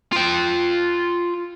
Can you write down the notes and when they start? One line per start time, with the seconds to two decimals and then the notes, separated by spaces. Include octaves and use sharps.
0.13 F4 G5